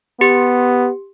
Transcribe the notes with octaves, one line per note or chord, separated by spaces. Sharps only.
B3 G4